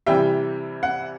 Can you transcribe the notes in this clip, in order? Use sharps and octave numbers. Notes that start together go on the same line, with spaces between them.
C3 E3 G3 E5 G5
F#5